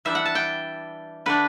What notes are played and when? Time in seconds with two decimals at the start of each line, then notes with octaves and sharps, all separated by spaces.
0.05 E3 G3 D4 E5
0.15 F#5
0.25 A5
0.35 G5
1.26 D3 A3 D4 B4